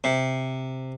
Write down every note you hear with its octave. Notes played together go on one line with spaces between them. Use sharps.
C3